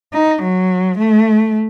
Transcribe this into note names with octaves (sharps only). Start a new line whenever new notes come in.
D#4
F#3
A3